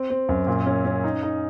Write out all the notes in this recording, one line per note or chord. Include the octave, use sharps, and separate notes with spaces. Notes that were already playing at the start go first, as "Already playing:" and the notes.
Already playing: C4
C4
F#2
A#2
C#4
C#4
D#4
D#4